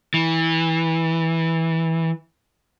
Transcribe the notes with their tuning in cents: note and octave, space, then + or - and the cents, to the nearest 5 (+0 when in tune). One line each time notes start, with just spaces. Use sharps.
E3 -15